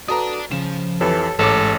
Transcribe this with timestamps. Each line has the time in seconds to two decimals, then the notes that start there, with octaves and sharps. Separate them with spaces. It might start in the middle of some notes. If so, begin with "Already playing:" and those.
0.08 F#4 A4 B4 D5 A5 A#5 D#6
0.51 C#3 F3 F4 E7
1.01 F2 E3 G4 A4 B4 C#5
1.39 A1 G#2 G#3 A4 C#5 D6